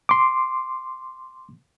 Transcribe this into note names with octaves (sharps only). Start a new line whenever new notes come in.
C6 D6